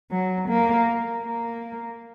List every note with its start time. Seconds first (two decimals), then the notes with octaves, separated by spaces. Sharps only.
0.11 F#3
0.49 A#3
1.24 A#3